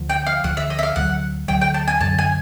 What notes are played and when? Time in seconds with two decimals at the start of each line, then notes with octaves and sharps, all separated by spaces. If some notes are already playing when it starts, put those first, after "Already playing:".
Already playing: D2 D3 F3
0.10 G5
0.27 F5
0.44 D2 D3 F3 F#5
0.57 E5
0.70 D#5
0.79 E5
0.83 F5
0.96 D2 D3 F#3 F#5
1.48 D2 D3 F#3 G5
1.61 G5
1.74 A5
1.88 G#5
2.00 F#2 D3 F#3 A5
2.19 G#5